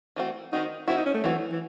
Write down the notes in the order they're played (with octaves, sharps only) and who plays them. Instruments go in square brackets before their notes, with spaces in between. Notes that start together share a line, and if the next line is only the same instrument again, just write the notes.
[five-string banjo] E3 A3 C4 F#4
[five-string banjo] D#3 F#3 C4 F#4 [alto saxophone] D#4
[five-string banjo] D#3 F#3 C4 F#4 [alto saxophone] E4
[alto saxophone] D#4
C#4
A3
[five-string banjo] D#3 F#3 C4 F#4 [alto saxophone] E3
[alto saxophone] E3